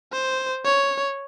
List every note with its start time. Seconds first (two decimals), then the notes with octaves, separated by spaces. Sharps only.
0.13 C5
0.65 C#5